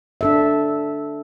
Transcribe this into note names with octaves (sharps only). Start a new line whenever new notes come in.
D4 A4 E5